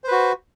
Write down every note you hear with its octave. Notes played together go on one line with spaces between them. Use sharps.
F#4 B4 C5